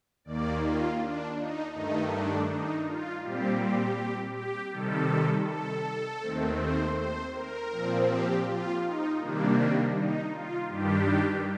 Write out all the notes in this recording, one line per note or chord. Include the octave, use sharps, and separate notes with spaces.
D#2 D#3 A#3 D5
F4
D4
D#4
G2 D#3 A3 D#4
D4
D#4
F4
A#2 G3 C4 G4
G4
G4
C3 D#3 G3 A4
A4
D#2 D#3 A3 C4
C5
C5
A#4
A#2 F3 C4
G4
F4
D#4
C3 D#3 G3 A#3 D4
D#4
F4
G2 D#3 G3 D4 G4